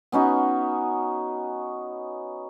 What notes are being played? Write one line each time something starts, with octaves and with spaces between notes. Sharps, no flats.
B3 C#4 D#4 F#4